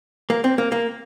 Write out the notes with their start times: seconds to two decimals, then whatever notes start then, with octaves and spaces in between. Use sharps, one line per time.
0.30 A#3
0.44 C4
0.58 A#3
0.72 A#3